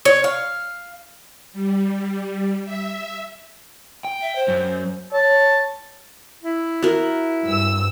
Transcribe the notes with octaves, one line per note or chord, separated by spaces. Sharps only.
C#5
F5
G3
E5
G5
E5
C5
F#2
C#5 A5
E4
F#4 A#4
G2 E6